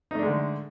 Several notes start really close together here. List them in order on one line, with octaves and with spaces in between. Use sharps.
D#4 A3 D4 G#3 D3